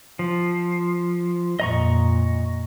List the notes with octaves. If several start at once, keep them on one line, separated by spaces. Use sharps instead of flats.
F3
F2 A#2 D#5 A#5 C#6